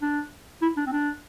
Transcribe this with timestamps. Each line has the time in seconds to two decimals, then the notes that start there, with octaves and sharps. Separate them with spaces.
0.02 D4
0.62 E4
0.77 D4
0.87 C4
0.92 D4